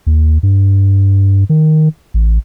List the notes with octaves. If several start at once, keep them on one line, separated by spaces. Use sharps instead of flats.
D#2
G2
D#3
A1